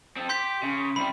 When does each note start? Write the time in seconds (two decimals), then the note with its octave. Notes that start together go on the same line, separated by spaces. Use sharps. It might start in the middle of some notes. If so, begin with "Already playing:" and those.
0.16 C4 A4
0.29 G4 C6 G6 B6
0.63 C#3
0.96 C2 G3 B5